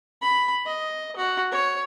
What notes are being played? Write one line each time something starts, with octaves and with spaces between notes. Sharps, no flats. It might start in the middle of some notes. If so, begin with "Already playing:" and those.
B5
D#5
F#4
C#5